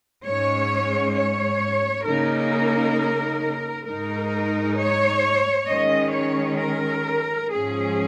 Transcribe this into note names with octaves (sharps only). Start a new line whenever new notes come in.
G#2 G#3 C#4 C#5
C#5
C#3 A#3 D#4 A#4
G#2 G#3 D#4 A#4
C#5
D#3 G#3 C#4 D#5
C#5
A#4
G#2 F3 C#4 G#4